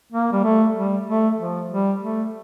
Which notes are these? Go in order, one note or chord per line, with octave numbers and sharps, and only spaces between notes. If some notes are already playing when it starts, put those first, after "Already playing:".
A#3
G3
A3
G3
A3
F3
G3
A3